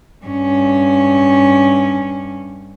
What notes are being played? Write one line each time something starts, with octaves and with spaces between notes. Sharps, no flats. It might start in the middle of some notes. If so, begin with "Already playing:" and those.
G2 C#4